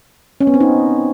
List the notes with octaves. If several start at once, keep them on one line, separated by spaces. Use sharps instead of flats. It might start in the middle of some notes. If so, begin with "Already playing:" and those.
C#4
B3
C4
D#4